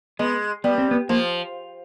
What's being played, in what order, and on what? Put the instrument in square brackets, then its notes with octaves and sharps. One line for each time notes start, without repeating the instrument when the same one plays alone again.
[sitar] G#3 [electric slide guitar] B3
[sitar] G3 [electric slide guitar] B3
[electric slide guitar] C4
B3
[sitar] F3 [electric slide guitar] A#3